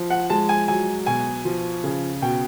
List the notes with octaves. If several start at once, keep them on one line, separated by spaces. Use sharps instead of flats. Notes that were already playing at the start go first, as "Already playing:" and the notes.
Already playing: F3
F#5
G#3 A5
G#5
F#3 G#5
B2 G#5
F3
C#3
B2 G5